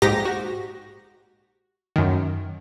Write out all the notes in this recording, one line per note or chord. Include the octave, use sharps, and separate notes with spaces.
A#1 G#2 D#4 G4 A#6
F#4
F#2 D#3